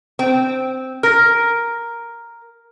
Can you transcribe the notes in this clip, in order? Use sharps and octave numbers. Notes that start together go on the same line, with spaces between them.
C4
A#4 F6 A#6